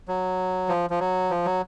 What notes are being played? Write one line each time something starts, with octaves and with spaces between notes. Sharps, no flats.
F#3
F3
F3
F#3
F3
F#3